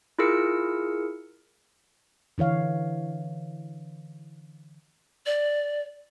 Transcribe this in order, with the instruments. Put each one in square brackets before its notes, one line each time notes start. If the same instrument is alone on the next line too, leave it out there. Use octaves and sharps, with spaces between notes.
[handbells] E4 F4 G#4 A#4 E6 C#7
[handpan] D3 E3 C#5 F5
[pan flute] D5